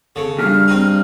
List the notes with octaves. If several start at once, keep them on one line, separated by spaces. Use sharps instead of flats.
C#3 A4
E2 G2 F6
C4 D#4